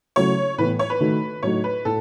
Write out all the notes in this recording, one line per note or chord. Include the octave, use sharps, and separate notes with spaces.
C#3 F#3 A3 E4 C#5
A2 E3 B3 E4 B4
C#5
B4
D#3 A3 D#4 F#4
A2 F#3 A3 D#4 F#4 C#5
B4
A2 A4